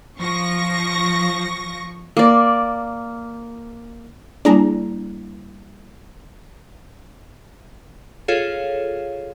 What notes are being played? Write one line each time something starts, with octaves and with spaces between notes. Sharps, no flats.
F3 C#6 A#6
A#3 D5
G3 A#3 D4 E4 G#4 A#5
F4 G#4 A4 C#5 F5